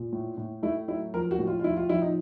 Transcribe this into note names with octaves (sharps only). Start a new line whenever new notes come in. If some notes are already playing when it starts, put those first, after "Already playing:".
Already playing: A#2
A2
A2
A3 E4
F#3 E4
F3 A#4
F#4
A2
F4
F4
F3 E4
F4
F3 E4
D#4